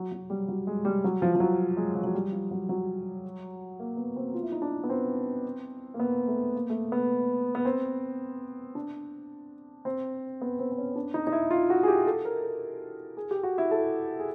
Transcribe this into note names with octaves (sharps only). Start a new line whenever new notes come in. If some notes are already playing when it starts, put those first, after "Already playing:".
Already playing: F#3
F#3
G3
F#3
G#3
G3
F#3
F3
F3
F#3
G#3
F3
F#3
G3
F3
F#3
F#3
A#3
B3
C4
F4
E4
D#4
D4
B3
C4
A#3
B3
A3
A#3
A3
A#3
B3
B3
C4
D4
C4
B3
C4
C4
C#4
D4
D#4
D#4
E4
F4
F#4
G#4
G4
A4
A#4
A4
G#4
G4
F#4
E4
A4
G#4